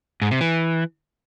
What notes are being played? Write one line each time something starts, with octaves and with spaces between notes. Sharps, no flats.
G#2
C3
E3